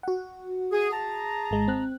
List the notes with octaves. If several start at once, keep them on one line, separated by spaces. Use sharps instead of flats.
F#4 F#5
G#4
G#4 A5 A#5
G#1 G#3
C4 F#6